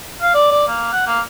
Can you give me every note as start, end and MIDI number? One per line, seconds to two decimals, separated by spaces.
0.21 0.32 77
0.34 0.51 74
0.51 0.65 74
0.68 0.89 58
0.92 1.05 78
1.07 1.20 58